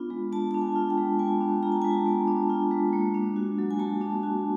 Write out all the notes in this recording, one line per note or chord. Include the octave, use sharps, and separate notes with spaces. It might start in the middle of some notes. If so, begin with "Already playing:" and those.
Already playing: B3 D4 F4
G#3
B3 A5
D4 A5
G#5
F4
G5
G#3
B3 G#5
D4
F4 A#5
A5
G#3 G#5
A5
B3
D4
F4
G#3
A#3
D4
F#4
F#3
G#5
A#3 A5
D4
F#4